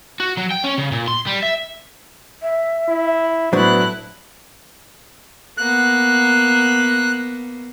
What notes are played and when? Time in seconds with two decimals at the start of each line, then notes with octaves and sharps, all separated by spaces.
0.20 F#4
0.37 F#3
0.51 G5
0.64 C#4
0.78 C#3
0.92 A#2
1.08 C6
1.27 G3
1.43 E5
2.42 E5
2.88 E4
3.53 A2 F#3 B3 D4 E4 B4 C5 F#6
5.58 A#3 B3 F#6